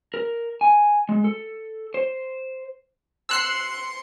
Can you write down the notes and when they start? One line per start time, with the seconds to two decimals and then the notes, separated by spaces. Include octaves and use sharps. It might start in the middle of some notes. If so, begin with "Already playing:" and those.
0.14 A#4
0.61 G#5
1.09 G#3
1.24 A4
1.94 C5
3.29 C6 E6 F#6 C7 C#7